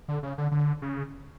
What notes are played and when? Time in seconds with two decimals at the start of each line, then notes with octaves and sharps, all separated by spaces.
0.08 D3
0.23 C#3
0.38 D3
0.52 D3
0.82 C#3